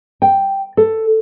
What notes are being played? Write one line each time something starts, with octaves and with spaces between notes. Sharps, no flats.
G5
A4